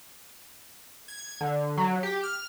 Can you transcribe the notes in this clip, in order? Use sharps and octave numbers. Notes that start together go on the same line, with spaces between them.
G#6
D3
F#3
G4
F6